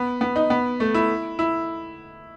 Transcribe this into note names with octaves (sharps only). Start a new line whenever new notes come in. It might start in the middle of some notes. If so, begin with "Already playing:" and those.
Already playing: B3
B3
D#4
B3
A3
E4
E4